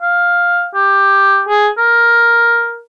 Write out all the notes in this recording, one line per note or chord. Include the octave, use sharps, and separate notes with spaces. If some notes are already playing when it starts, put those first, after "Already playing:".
F5
G4
G#4
A#4